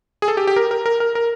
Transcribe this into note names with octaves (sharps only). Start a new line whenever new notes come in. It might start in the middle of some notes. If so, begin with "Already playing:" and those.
G#4
A4
G4
G4
A#4
A#4
A#4
A#4
A#4